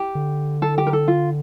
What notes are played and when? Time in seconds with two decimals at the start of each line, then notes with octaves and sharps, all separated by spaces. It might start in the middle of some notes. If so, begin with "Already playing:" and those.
Already playing: G4
0.15 D3
0.62 A4
0.78 G4
0.87 A#4
0.93 A4
1.08 F4